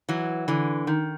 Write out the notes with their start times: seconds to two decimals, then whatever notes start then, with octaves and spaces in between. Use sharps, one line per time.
0.09 E3 F#3
0.48 D3 E3
0.87 D#3